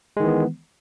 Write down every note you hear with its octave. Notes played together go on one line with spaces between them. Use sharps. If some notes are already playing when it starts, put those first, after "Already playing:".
D#3 E3 G#3 B3